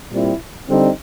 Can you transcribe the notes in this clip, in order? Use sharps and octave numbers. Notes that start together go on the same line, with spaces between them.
A#2 G3 C4 E4
D3 G3 C4 D#4